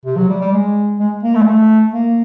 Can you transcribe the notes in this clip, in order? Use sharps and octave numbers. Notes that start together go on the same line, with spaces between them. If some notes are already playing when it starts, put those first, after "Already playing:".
C3
F#3
G3
G3
G#3
G#3
A#3
A3
G#3
A3
A#3